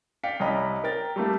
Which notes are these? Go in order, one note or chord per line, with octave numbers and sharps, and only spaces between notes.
D5 F5 G5 B6 C#7
C2 C#4 D#5 A#5 B5
A#4 G5 A6
G3 A3 A#3